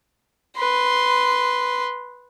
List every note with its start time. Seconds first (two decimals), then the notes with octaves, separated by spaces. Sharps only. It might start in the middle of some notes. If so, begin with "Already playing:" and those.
0.57 B4 C6